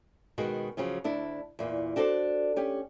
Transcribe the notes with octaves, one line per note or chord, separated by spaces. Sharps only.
B2 D#3 G#3 F#4
C#3 F3 F#3 C#4
D2 D4 E4
E2 A#2
D4 F#4 A4 A#4 C5 D5
C#4 G4